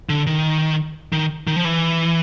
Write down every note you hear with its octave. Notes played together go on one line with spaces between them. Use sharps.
D3
D#3
D#3
D#3
F3
E3